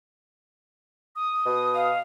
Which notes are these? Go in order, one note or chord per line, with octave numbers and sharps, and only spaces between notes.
D#6
B2
F5